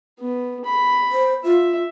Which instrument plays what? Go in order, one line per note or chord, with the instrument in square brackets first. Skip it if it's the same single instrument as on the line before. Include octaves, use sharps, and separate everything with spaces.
[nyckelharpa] B3
B5
[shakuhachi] C5
[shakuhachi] F4 [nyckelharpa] E5